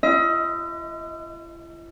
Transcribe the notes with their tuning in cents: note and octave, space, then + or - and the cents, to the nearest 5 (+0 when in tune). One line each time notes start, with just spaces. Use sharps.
E4 +45 D#5 +35